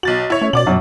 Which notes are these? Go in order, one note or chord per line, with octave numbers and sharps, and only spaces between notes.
B1 F#4 A6 F#7
E4 C#5
A3 C#4
B2 D5 D6 F#7
F#2 B2 F#3